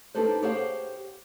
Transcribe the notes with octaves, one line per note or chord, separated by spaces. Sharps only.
D4 D#4 G4 A4 B4 C5
G4 G#4 C5 C#5 F5 F#5